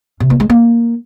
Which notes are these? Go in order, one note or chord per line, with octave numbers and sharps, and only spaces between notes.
C3
A#3
G#3
A#3